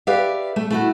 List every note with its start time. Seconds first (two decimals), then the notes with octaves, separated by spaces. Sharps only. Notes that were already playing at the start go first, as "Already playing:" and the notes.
0.07 G4 B4 D5 E5 F5
0.56 A3
0.71 A3 E4 F#4